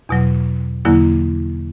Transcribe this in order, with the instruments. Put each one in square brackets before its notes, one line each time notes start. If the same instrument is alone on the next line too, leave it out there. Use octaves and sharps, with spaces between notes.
[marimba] E2 B2 F#3
E2 D3 F#3 A#3 E4